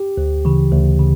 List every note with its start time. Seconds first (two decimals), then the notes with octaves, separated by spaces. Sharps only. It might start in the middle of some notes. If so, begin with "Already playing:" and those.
Already playing: G4
0.17 D2
0.45 C#3 E3
0.72 D2
0.99 C#3